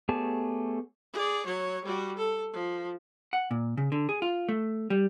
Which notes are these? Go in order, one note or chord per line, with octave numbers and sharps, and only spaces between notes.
A3 B3 G4 G#4 C#5 A5
G#4 D5
F#3 C#5
G3 F#4
A4
F3
F#5
A#2
C#3
D3
G#4
F4
A3
G3